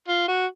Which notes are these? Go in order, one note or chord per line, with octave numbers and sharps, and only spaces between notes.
F4
F#4